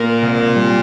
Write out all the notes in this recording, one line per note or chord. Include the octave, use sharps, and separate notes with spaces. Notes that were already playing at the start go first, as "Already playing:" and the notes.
Already playing: A#2 A#4
C3
G3